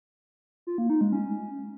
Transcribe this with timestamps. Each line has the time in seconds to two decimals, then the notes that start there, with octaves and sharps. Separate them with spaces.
0.67 F4
0.78 A#3
0.90 D#4
1.01 G#3
1.12 C#4